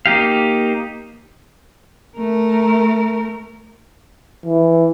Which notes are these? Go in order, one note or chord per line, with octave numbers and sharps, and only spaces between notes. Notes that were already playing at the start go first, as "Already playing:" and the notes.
A#3 D#4 G4 F5
A3 A#4
E3